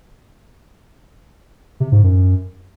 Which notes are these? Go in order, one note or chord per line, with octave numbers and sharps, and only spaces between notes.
C3
G#2
F#2